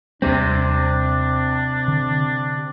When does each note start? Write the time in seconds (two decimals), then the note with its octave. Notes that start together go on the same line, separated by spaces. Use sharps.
0.22 D#2 C3 G3 C4 D4
1.88 D3